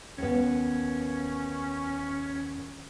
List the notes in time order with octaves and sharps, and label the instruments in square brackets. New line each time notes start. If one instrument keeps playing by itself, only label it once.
[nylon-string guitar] D#2 B3 [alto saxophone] C#4